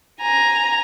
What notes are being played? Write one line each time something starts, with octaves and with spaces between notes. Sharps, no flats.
G#5 A#5